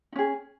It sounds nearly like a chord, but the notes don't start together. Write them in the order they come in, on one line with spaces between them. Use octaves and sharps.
D#4 C#4 G#4